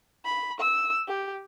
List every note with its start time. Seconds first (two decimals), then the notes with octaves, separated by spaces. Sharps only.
0.25 B5
0.60 E6
1.08 G4